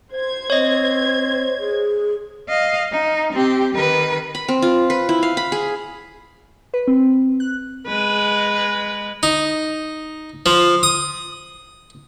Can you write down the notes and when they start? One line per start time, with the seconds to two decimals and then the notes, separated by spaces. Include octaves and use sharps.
0.13 C5 G#6
0.50 C4 C#5 D#5
1.59 G#4
2.49 D#5 F5
2.91 D#4
3.32 C4 G4
3.75 D#3 B4
4.35 B5
4.48 C4
4.62 F4
4.90 B4
5.09 E4
5.23 F5
5.37 B5
5.52 G#4
6.74 B4
6.87 C4
7.40 F#6
7.87 G#3 B4
9.23 D#4
10.46 F3
10.83 D#6